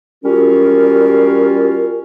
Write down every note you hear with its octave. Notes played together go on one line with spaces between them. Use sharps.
G3 C#4 F4 F#4 A#4